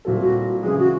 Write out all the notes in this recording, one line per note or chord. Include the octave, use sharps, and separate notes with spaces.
A#2 G3 C4 E4 F#4 A4
F#4
C#3 E3 G#3 G#4
F#4